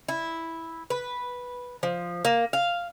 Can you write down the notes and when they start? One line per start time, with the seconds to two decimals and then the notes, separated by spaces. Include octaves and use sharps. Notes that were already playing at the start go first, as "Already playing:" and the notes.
0.08 E4
0.90 B4
1.83 F3
2.25 A#3
2.53 F5